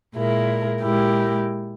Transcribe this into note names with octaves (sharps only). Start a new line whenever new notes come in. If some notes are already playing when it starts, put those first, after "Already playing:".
A#2 G#3 E4 A#4
A#2 G#3 E4 G4 A#4